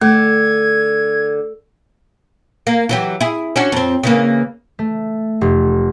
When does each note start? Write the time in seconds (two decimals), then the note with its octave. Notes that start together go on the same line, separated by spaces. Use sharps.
0.01 D3 A3 G#6
2.67 A#3
2.89 E3 F#3 G4
3.21 E4 G#4
3.56 C#4 D4 F#4
3.72 F2 C4
4.03 C#3 E3 A#3
4.79 A3
5.41 F1